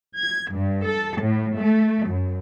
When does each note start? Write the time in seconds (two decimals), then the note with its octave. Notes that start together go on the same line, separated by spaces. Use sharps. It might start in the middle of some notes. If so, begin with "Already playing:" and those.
0.18 G#6
0.52 G2
0.86 A4
1.18 A2
1.56 A3
2.08 F#2